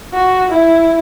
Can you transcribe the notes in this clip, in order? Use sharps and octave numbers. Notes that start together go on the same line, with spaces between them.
F#4
E4